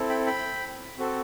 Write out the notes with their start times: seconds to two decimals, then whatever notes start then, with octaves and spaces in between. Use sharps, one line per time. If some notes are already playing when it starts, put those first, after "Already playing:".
Already playing: C4 E4 A4
0.10 G5 B5
0.26 G5 B5
0.98 C4 F#4 A4